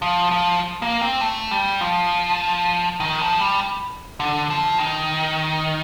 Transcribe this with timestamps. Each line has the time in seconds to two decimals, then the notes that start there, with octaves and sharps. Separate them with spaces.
0.02 F3
0.31 F3
0.82 A#3
1.01 C4
1.21 A3
1.51 G3
1.81 F3
3.00 D#3
3.20 F3
3.40 G3
4.20 D3
4.50 F3
4.80 D#3